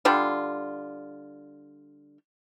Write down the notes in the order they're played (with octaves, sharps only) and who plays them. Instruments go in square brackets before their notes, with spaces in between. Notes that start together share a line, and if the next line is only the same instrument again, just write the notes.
[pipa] D3 G3 D4 F4